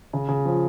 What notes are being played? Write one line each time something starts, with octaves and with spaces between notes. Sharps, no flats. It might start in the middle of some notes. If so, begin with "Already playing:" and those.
C#3
C#3
F3